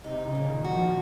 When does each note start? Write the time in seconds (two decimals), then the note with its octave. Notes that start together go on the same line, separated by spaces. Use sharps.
0.04 C3 D#4
0.27 C#3
0.35 A#2
0.49 D#3
0.65 F#4
0.72 F3